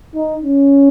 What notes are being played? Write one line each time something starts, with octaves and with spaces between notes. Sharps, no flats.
D#4
C#4